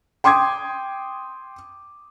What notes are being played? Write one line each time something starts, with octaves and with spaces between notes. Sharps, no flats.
G5 C6 D6 D#6 G#6